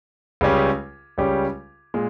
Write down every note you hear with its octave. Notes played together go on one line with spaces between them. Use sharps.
C#2 C#3 G3 C#4 G4
C#2 C#3 G3 C#4 G4
A#2 G#3